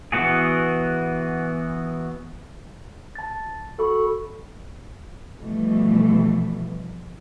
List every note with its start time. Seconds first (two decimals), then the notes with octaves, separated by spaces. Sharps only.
0.12 E3 B3 F#4 G#4
3.15 A5 A6
3.78 F#4 A4 B5 C#6
5.38 B2 E3 F3 G3 A3